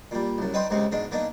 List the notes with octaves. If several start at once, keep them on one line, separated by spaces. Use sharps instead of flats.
A#2 G3
C2 F#2
D#4 B4 D5 G5 C6
C#2 G#2 C3 C4
G#2 B2 G#3 D4
A#3 B3 D4 D#4